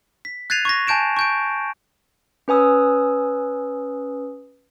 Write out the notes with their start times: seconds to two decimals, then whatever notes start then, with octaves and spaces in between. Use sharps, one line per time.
0.25 B6
0.50 F#6 G#6 A6 C7 D#7 F7
0.65 C#6 G#6 A#6
0.87 G#5 A5 G6 D7 E7
1.17 C#6 G6 D7
2.48 C#4 B4 G#5 D#6 E6